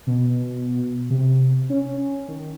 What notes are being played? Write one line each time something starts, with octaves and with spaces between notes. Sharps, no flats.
B2
C3
C#4
D#3